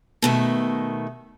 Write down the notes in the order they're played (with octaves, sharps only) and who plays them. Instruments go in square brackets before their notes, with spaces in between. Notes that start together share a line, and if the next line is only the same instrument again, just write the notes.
[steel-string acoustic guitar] B2 D#3 A3